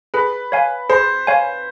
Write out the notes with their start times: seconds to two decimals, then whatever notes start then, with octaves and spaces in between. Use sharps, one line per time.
0.14 G#4 B4
0.52 C#5 F5 G#5
0.90 G#4 C5
1.27 C#5 F5 G#5